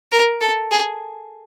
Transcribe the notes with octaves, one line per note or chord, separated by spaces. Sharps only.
A#4
A4
G#4